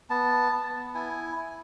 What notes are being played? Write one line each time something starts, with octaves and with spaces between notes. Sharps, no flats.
B3 A5
B3
E4 G#5
E4